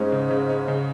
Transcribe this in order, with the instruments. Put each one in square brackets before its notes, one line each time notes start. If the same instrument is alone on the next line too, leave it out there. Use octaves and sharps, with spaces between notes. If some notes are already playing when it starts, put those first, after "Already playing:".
Already playing: [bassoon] G#2 [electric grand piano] G#3 C#4
[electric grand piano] C#3
C#3
C#4
C#3